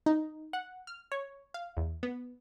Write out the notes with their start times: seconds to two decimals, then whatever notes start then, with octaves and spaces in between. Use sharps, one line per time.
0.06 D#4
0.53 F#5
0.87 F6
1.12 C#5
1.54 F5
1.77 E2
2.03 B3